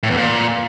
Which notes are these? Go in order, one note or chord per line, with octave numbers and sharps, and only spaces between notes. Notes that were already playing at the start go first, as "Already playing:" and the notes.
A2
E2
A#2